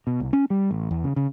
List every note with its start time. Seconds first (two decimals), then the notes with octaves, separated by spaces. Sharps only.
0.07 B2
0.20 C2
0.33 C#4
0.50 G3
0.71 A1
0.91 E2
1.04 C#3
1.16 C#3